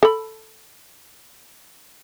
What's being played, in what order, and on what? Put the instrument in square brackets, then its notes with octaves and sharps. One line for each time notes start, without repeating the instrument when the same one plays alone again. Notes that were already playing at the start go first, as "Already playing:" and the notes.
[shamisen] A4 B5